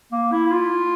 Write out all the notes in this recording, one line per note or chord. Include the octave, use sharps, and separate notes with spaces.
A#3
E4
E4
F4